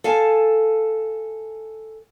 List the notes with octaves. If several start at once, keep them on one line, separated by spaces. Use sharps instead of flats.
A4 F5 G#5 A5